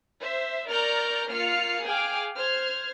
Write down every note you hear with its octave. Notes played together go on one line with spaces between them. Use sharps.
C5 E5
A#4 D5 A#5 C#6 F6 G6
A#3 F4 F5 F6 C7 C#7
G#4 F5 G5 G#5 D6 F6
C5 F6 G#6